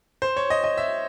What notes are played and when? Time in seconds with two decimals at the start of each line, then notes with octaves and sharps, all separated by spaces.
0.22 C5
0.37 C#5
0.50 D#5
0.64 D#5
0.78 E5